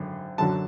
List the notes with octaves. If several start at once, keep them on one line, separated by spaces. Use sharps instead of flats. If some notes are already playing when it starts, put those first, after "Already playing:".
Already playing: G#1 F#2 D3
F#2 D3 F#3 A5